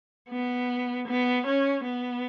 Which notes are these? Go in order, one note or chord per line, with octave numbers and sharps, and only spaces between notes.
B3
B3
C#4
B3